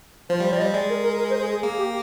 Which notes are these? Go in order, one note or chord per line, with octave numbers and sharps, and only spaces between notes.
F3 C5
G3 C5
F3 D5
D#5
G3
G#3 D5
A#4
A#4
A#4
C5
G#4
G#4
A#3 G#4
G4